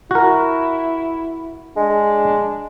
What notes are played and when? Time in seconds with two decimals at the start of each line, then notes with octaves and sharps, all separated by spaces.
0.11 E4 F#4 A#4
1.76 G#3 D4